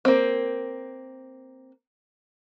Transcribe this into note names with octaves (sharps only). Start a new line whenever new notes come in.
A#3 C4